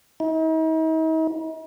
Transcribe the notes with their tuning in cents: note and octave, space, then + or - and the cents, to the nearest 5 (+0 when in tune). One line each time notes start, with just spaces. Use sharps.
D#4 +45